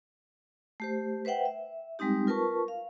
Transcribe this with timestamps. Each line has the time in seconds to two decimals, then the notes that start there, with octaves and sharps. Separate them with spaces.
0.80 A3 G4 C5
1.25 B4 C5 E5 F#5 G5
1.45 E5
1.99 G3 G#3 C4 D#4 G4
2.27 F4 A#4 B4 A5 C#6
2.68 F5